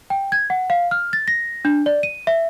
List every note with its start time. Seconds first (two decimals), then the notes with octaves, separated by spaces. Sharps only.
0.10 G5
0.32 G#6
0.50 F#5
0.70 F5
0.91 F6
1.13 A6
1.28 A#6
1.65 D4
1.86 D5
2.03 D#7
2.27 E5